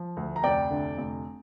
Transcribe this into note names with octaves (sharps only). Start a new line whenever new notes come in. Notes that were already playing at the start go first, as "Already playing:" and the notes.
Already playing: F3
D2
A#5
F1 D5 G5
D3
F1